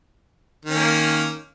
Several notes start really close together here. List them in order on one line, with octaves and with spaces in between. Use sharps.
D#3 C#4 A#3